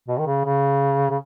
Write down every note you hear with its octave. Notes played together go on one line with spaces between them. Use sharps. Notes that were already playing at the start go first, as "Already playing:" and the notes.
B2
D#3
C#3
C#3
C#3